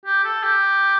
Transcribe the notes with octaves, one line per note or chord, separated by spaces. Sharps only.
G4
A4
G4